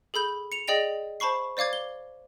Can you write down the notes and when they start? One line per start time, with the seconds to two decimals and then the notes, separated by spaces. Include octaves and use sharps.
0.14 G#4 A4 B5 G6
0.52 C#7 F7
0.68 G#4 D5 D#5 G5 A#6 F7
1.20 C5 A5 B5 C#6 C7
1.57 C5 D5 F5 D6 G#6
1.73 G7